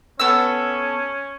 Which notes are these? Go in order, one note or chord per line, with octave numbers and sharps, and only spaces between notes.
B3 C#4 A4 E6